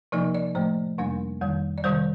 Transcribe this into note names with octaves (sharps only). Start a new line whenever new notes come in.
C3 F3 A#3 D#4 D5
D5
A2 F3 A3 C5
F2 C3 G3 A#3 D4
F2 D#3 G3
D5
C3 D#3 G3 C5